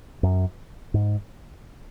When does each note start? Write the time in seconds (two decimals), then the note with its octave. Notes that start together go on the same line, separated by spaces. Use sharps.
0.23 F#2
0.94 G#2